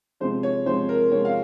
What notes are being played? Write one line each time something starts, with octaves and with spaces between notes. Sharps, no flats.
C3 F3 G#3 C5
C#5
C3 F3 G#3 C5
A#4
C3 F3 G#3 C#5
F5